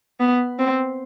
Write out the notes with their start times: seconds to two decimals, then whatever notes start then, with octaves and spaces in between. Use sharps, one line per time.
0.20 B3
0.59 C4